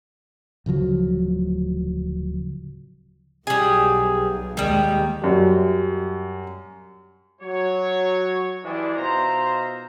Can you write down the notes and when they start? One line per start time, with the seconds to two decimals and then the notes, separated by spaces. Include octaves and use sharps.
0.66 D1 C#3 F3 F#3
3.47 B1 B2 G3 G#4
4.57 D#2 D#3 G3 G#3
5.22 F#2 G3
7.41 F#3 C#5
8.63 E3 G3 G#3 D4
8.95 B2 D#4 F4 C5 E5 A#5